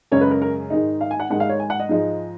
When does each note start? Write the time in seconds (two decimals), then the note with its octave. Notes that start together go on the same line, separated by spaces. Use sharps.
0.12 F#2 C#3 G#3 C#4 C#5
0.21 B4
0.31 A#4
0.42 A#4
0.70 G#2 D#3 G#3 D#4
1.01 F5
1.11 G#5
1.20 F#5
1.30 G#2 D#3 G#3 F#5
1.40 F5
1.49 C#5
1.60 G#5
1.70 F#5
1.80 D#5
1.89 G#2 F3 G#3 D#4